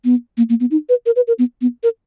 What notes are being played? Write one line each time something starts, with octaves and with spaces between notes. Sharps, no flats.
B3
A#3
A#3
B3
D#4
B4
A#4
B4
A#4
B3
B3
A#4